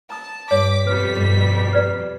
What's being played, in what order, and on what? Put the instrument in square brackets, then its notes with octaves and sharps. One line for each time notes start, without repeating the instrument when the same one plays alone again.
[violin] A5 [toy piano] A#5 D#6
[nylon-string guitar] G2 [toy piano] C#5 [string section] D6 [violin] B6
[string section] F2 B2 G3 [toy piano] B4
[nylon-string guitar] G2
[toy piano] B4 D5 A#5